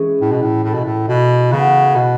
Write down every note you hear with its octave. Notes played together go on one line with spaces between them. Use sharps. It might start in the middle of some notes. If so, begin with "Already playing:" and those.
Already playing: E3 G#3 C#4 G#4
A2
B2
A2
A2 A3 E4 A4
B2
A2
B2
C#3 E3 B3 F#4
B2